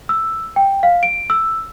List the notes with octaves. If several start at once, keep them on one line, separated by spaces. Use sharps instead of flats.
E6
G5
F5
D7
E6